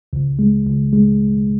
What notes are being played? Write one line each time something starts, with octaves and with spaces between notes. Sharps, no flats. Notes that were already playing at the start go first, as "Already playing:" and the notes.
C#2
G#3
C#2
G#3